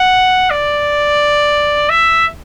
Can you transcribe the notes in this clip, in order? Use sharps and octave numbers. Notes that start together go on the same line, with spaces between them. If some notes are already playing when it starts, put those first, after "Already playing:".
Already playing: F#5
D5
E5